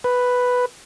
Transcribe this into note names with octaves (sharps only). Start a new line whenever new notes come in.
B4